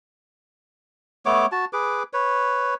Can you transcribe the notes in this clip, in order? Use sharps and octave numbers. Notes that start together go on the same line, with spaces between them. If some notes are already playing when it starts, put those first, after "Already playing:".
A3 B3 C#5 D6
F#4 A5
G#4 B4 D6
B4 C#5